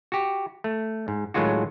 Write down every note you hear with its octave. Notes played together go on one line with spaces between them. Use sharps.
F#4 G4
A3
G#2
A2 D#3 F#3 G#3 F4 F#4